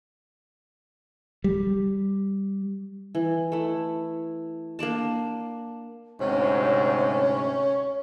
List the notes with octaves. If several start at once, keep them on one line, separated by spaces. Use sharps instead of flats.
G3
E3
A3 E4
A#3 D4 D5 A5
D2 G#2 C3 C#4 C#5